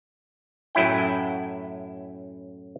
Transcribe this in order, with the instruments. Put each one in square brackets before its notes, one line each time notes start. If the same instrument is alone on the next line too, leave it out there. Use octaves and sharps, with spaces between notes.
[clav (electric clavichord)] F#2 A2 F#3 E4 G5